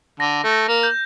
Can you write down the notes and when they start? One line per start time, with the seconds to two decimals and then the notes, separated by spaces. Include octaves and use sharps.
0.20 D3 A#6
0.44 A3
0.51 A#6
0.68 A#3
0.83 G6